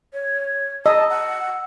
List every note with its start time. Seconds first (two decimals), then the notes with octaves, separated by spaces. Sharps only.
0.13 C#5
0.86 D#5 A5 E6
1.10 F#5